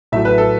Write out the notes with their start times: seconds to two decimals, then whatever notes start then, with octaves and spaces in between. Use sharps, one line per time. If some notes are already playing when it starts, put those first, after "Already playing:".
0.12 A2 F#3 A3 E5
0.25 B4
0.38 A4